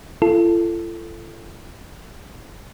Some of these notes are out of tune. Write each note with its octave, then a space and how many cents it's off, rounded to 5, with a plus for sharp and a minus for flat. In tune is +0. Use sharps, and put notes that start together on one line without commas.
F4 -45 A4 +0